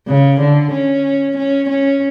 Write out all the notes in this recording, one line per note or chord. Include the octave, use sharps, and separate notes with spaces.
C#3
D3
C#4
C#4
C#4